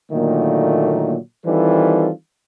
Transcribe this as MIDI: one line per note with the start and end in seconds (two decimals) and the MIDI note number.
0.12 1.17 46
0.12 1.17 50
0.12 1.17 51
0.12 1.17 54
0.12 1.17 57
0.12 1.17 58
1.46 2.11 51
1.46 2.11 52
1.46 2.11 55
1.46 2.11 60
1.46 2.11 65
1.46 2.11 69